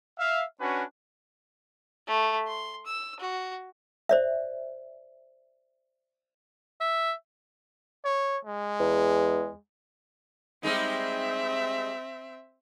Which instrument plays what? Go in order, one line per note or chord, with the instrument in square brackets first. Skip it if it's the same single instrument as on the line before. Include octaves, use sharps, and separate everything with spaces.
[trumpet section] E5 F5
C#4 D4 F#4 B4 G#5
[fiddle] A3
C6
E6
F#4
[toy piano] C5 D5 E5
[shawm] E5
[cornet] C#5
G#3
[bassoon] E2
[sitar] G3 G#3 D#4 [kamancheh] C4 E5